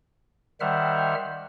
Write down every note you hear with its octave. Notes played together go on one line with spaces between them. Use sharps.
D#3 G3 C5 E5 F#5 F6